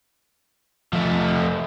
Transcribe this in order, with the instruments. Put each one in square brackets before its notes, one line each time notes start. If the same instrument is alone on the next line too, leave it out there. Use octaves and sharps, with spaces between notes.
[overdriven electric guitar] F3 A3